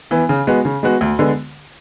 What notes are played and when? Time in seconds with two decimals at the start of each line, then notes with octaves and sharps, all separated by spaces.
0.11 E3 B3
0.29 C#3
0.47 G#3 B3 F#4
0.65 C#3
0.83 G#3 B3 F#4
1.01 D2
1.19 D3 G#3 B3